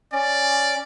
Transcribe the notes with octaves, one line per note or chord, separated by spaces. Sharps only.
C#4 D5